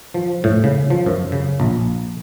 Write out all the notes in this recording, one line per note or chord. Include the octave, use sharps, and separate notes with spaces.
F3
A2
C#3
F3
F#2
C#3
A#1